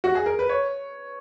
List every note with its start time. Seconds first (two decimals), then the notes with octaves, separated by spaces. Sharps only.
0.04 F#4
0.15 G#4
0.26 A#4
0.39 B4
0.49 C#5